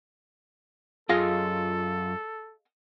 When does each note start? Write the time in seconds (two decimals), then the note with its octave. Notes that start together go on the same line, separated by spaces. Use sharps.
1.09 F#2 F4 G#4 A4 D#5 F5